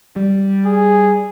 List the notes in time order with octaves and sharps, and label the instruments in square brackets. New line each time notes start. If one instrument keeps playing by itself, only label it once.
[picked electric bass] G3
[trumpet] G#4